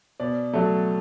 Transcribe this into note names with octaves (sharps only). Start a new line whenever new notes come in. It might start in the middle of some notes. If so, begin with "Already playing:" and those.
B2 D5
F#3 A3